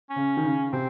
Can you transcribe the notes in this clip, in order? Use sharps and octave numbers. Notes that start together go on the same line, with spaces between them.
C#4
C#3
D#3
C#3
C3 C4